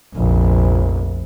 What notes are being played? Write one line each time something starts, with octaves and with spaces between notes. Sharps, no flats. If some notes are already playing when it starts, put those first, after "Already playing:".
F1 A#1